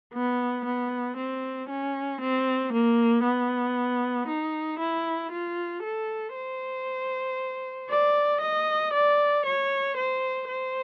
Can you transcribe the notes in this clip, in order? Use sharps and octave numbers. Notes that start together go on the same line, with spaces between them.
B3
B3
C4
C#4
C4
A#3
B3
D#4
E4
F4
A4
C5
D5
D#5
D5
C#5
C5
C5